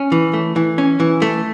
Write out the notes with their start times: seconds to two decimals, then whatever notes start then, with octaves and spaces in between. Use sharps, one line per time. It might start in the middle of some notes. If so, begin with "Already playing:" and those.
Already playing: C#4
0.12 E3
0.34 A3
0.56 E3
0.78 C#4
1.00 E3
1.22 A3